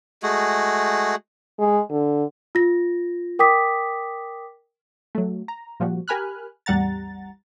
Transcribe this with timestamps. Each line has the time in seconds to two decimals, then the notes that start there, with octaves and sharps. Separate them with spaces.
0.23 G#3 A3 F#4 G#4
1.59 G#3
1.91 D3
2.55 F4 A#6
3.39 A#4 G5 D6 D#6 B6
5.15 F#3 A3
5.48 A#5
5.80 A#2 F3 G3 F#4
6.08 G4 A#4 G#5 B5 F6 F#6
6.66 A1 E2 G3 F#5 A#5 A6